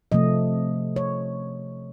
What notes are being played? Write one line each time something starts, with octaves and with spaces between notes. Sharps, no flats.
C3 F3 A3 D#5
C#5